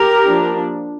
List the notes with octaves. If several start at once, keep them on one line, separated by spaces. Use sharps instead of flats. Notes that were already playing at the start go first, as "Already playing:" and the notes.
Already playing: G4 A#4
F3 A#3 D4